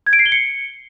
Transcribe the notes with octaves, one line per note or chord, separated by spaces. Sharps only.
G#6
D7
C7
G7
C#7